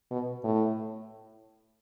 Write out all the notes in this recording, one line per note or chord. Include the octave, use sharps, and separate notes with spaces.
B2
A2